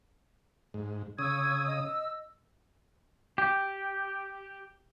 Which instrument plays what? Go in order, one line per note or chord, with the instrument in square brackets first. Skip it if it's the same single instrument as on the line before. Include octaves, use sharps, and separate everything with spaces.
[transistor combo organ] G#2
[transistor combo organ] C#3 D#6 [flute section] C#6 E6 G#6
[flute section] D#5 E6
[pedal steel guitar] G4